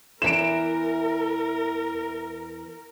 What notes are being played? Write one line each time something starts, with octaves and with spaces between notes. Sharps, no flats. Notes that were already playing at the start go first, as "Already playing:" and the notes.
E2 E3 A#4 D7 E7